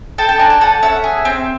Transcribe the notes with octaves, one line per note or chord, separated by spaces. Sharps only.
A4 G5 A5
G5 A5
D4 G#5 A#5
G5 A5
A4 F#5 G#5
C#4 E5 F#5
G#4
C4